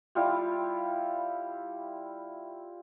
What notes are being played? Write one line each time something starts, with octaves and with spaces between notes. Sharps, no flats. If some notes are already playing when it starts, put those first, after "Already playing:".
G3 E4 F4 G4